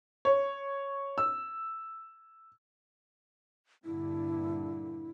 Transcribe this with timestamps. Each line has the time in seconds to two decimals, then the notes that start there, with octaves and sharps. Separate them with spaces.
0.25 C#5
1.18 E6
3.85 G2 A#2 D3 E4